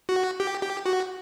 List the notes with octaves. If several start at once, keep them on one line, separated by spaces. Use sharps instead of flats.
F#4
G4
G4
F#4